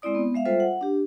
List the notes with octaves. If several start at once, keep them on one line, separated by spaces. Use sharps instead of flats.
G#3 C4 E4 D5 D#6
B3
G#3 E5 F5
G3 F4 A4 C5 E5
F#5
D4 G4